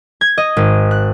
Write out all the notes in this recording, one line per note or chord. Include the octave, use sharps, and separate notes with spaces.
G#6
D#5
G#1
F#6